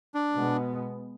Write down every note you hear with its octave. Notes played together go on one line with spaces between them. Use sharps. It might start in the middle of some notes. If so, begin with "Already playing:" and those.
D4
B2 G#3 B3